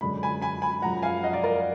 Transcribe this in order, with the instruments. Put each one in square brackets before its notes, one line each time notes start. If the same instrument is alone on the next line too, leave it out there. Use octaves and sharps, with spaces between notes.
[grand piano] F#2 D3 G#3 B5
G#5 B5
G#5 B5
G#5 B5
F#2 F3 G#3 F#5 A#5
F5 G#5
D#5 F#5
D5 F5
A#4 D5